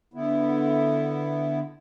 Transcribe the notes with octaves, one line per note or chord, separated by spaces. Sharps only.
D3 B3 E4